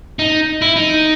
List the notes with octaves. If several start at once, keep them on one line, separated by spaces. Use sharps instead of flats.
D#4
E4
D#4